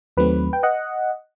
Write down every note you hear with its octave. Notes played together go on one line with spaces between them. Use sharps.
D#2 D#3 F#3 A3 C4 B4
G5
D#5 F#5